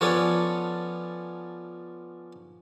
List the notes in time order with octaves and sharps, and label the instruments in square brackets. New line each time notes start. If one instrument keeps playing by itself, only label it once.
[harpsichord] F3 B3 C#4 D4 A4 C#5